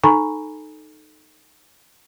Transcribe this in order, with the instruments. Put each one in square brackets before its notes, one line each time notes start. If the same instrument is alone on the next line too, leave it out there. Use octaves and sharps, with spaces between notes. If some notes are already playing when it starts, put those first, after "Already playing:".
[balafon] D#4 A4 G#5 A#5 B5 C#6